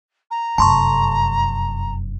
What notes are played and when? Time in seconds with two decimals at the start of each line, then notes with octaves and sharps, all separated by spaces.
0.30 A#5
0.58 F1 F#2 A5 C6 C#6